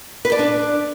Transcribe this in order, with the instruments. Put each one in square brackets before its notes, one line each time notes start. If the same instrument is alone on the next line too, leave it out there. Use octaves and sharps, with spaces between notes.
[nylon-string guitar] B4
D5
D4